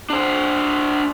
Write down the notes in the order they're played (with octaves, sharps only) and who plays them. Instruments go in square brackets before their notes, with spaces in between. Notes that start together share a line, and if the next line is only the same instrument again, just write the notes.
[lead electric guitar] D4 C5